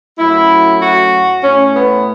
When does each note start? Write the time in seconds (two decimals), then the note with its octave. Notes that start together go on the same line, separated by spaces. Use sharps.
0.18 F#2 F#3 A3 E4
0.81 F#4
1.43 A2 A3 C#4
1.74 B3